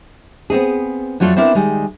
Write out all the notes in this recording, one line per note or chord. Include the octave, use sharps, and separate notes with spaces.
B3 C4 D#4 G#4
F2 F#3 A3 F4 A4 D5
B3 C4 D4 E4 A#4
D#3 G3 G#3